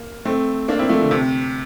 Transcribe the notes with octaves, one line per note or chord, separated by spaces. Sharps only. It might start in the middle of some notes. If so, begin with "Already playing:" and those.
Already playing: A#3
A3 C4
A#3 D4
C4 E4
F3 A3
D3
C3